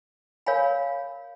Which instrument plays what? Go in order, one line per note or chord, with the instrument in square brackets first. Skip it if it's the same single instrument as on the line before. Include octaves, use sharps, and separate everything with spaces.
[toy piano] A#4 C#5 F5 G#5 B5